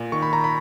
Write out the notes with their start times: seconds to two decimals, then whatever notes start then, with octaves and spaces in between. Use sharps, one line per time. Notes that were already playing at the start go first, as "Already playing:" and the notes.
Already playing: A#2
0.12 D#3 C#6
0.22 B5
0.33 A#5
0.44 B5